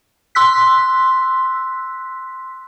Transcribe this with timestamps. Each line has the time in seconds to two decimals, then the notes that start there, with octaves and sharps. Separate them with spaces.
0.35 C6 E6 F#6 B6